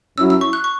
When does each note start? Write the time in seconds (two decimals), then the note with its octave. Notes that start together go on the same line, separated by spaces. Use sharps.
0.18 F#2 F#3 C#4 E4 E6
0.30 E6
0.41 C#6
0.53 F#6
0.64 C#6